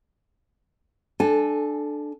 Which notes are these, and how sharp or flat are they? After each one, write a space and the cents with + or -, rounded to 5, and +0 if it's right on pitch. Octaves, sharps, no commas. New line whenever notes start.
D4 +15 A4 -15 G#5 +0